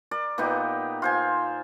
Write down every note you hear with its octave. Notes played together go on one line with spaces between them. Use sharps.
A#4 D5
A#2 B3 D#4 G4
F4 C5 G#5